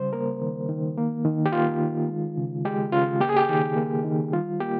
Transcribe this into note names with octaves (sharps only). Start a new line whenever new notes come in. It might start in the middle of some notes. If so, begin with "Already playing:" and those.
Already playing: C#3 G3 C5
A#3 A#4
D#3
D#3
A#3
D#3
G4
A#3 F4
D#3
G#3
C#3
G#3 G4
C#3 F4
A#3 G4
G#4
G4
D#3
A#3
D#3
G3 F4
A#3 G4